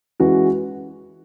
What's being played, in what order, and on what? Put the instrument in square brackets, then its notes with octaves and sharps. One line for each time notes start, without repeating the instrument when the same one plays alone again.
[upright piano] E3 G#3 C#4 F#4